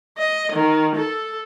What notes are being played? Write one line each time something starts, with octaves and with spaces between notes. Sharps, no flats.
D#5
D#3
A4